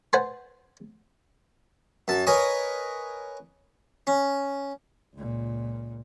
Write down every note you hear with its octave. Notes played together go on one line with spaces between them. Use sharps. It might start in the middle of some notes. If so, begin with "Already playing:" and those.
B4 C5 F#5 G#5 A5 C6
F#2 A5
A#4 B4 C#5 D#5 G#5
C#4
C#2 A#2